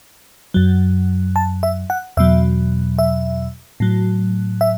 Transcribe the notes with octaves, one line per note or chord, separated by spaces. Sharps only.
F#2 F#3
A5
E5
F#5
E2 B2 F#3 E5
E5
A2 F#3
E5